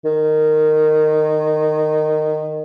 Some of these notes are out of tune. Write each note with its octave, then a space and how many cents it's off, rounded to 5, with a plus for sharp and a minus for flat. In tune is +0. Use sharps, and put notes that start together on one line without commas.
D#3 -15